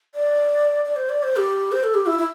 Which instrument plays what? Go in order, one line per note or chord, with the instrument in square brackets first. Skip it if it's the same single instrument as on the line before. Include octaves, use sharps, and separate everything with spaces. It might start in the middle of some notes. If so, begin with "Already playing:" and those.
[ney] D5
D5
C5
D5
C5
G4
C5
A4
G4
E4
E4